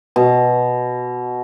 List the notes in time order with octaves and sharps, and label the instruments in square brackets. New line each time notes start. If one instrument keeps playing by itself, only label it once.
[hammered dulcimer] B2